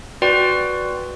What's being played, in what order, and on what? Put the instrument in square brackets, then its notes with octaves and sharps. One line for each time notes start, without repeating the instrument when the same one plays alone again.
[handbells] F#4 B4 D5 G5 C6